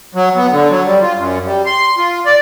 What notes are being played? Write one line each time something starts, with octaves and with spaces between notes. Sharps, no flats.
F#3
B3
D3
F#3
G3
F4
F#2
G3
C6
F4
D5